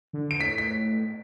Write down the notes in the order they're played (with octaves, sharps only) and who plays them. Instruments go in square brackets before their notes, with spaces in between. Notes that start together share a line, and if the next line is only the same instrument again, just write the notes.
[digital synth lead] D3
[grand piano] D7
[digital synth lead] A2 [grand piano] B6
[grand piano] B6